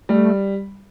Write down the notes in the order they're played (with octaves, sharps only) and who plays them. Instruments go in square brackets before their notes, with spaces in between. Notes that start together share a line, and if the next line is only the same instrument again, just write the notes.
[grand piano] G3 [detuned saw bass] A3